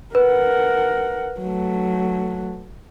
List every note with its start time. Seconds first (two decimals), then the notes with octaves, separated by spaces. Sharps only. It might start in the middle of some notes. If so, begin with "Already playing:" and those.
0.15 A#4 B4 F#5
1.41 F#3 A3